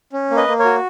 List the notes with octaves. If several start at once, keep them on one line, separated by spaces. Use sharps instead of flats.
C#4
A#3
B4 D#5
A#3
A#4 C#5
F#4